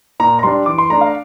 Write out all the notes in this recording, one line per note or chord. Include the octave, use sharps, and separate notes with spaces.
A#2 A#5
A#5
G3 D4 C6
E3 D6
C6
A3 D4 A#5
F5